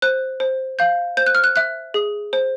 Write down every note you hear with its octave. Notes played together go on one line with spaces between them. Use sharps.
C5 F#6
C5
F5 G6
C5 G6
F#6
F6
F#6
E5 F#6
G#4
C5